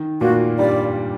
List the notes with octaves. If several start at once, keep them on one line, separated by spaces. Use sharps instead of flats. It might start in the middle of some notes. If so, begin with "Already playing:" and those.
Already playing: D#3
A#2 A#3 F#4
G2 G3 D5